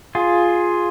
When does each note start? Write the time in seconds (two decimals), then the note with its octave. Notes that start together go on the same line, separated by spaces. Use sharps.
0.15 F4 G#4